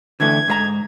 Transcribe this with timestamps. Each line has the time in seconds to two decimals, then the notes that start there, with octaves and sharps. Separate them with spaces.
0.20 D3 E3 A3 G#6
0.48 G#2 B4 A#5